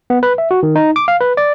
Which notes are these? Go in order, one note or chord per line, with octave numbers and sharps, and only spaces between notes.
B3
B4
E5
F#4
D#3
D#4
D6
F5
B4
D5